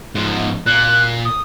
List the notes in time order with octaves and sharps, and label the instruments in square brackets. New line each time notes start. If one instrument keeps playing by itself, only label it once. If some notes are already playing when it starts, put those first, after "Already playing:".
[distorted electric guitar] G#2 F3
[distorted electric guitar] A#2 [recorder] F#6
[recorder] D#6